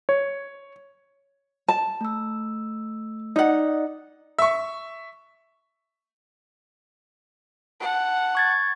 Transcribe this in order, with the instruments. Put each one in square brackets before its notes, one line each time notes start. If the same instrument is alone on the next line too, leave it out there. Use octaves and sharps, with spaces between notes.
[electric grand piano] C#5
[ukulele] A5
[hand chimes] A3 E6
[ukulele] D#4 F#5 [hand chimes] D5 D#5
[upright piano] E5 C#6
[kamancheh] F#5 A5
[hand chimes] C#6 G#6 A6